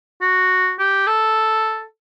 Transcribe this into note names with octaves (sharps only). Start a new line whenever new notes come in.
F#4
G4
A4